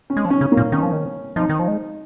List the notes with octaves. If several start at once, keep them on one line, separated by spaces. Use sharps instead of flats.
C#4
G#3
F3
C#4
C#3
A#3
A#2
D#3 C#4
F3
D#3
F3 D#4
D#3
F3
G#3